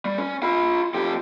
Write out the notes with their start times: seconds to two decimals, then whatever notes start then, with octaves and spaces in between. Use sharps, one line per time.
0.05 G3
0.18 C#4
0.43 F4 B5
0.94 F2 G4